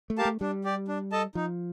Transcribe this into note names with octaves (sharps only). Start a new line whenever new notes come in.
A3
G4 A#4 F5 A5
A3
G3 D4
G4 D5
D4
A4 D#5 A5
F3 D#4